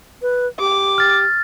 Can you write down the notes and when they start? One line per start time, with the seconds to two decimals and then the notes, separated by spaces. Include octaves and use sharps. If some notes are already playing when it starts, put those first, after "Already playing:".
0.22 B4
0.59 G4 D6
0.98 F6 A6